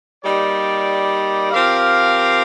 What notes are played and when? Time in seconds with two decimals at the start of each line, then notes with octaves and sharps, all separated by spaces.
0.24 G3 A#3 D#4 G4 D5
1.51 F3 C4 G4 A#4 F5